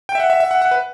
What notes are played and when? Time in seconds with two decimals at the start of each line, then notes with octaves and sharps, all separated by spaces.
0.09 G5
0.15 E5
0.20 F#5
0.30 E5
0.40 E5
0.51 F#5
0.62 F#5
0.71 B4